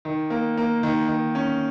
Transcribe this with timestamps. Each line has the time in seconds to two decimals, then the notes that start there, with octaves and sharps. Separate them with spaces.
0.05 D#3
0.30 A#3
0.57 A#3
0.83 D#3
1.08 D#3
1.35 C#4